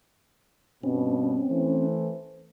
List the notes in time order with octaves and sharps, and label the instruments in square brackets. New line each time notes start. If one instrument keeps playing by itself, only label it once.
[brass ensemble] G2 B2 [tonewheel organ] C4 C#4
[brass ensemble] E3 A3 C5